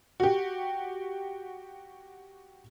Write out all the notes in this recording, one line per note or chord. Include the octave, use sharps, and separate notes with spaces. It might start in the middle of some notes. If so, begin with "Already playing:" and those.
F#4 G4